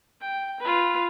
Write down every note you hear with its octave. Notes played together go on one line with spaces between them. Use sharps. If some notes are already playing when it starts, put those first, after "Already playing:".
G5
F4 B4